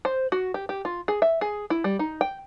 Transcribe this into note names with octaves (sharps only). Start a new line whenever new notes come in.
C5
F#4
G4
G4
F4
G#4
E5
G#4
E4
G3
D#4
G5